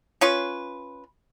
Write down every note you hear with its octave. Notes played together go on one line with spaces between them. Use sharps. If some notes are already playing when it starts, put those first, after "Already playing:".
C#4 F4 B4